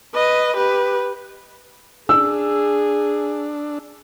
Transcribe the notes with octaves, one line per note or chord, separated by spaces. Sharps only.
B4 D#5
G4 B4
D4 G#4 E6